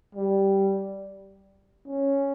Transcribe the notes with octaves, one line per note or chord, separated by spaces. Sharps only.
G3
C#4